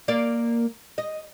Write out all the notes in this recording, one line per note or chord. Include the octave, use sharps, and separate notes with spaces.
A#3 D5
D#5